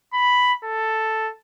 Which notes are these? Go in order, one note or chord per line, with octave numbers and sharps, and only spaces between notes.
B5
A4